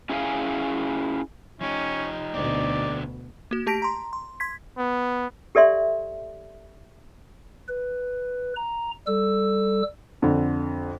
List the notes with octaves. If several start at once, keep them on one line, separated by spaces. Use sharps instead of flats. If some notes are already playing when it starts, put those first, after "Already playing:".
C#4 E4 G#4 C5 F5 G#5
F3 C#4 D#4 G4
D2 B2 D3 C4 D5
A#3 F#4
A3 G4 A5 A#6 B6 D7
A#5 C6
C6
C6 G#6 B6
B3
G4 A4 D5 E5 C6
B4
A#5
G3 A4 E6
F2 D3